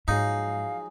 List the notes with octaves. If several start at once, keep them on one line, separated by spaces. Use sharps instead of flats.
G#2 F3 F#3 D#4 G#4 F5